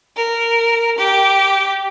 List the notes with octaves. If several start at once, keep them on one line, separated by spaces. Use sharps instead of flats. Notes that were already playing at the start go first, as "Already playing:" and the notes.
A#4
G4